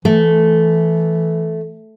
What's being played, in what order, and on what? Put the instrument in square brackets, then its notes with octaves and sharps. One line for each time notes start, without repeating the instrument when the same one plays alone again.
[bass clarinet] E3 [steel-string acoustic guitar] A3